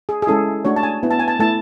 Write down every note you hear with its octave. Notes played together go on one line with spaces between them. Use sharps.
G#4
G#4
G#3 C#4 E4 A4
A3 D4 F#4 C#5
A5
G#5
B3 E4
A5
G#5
A5
A3 E4 A5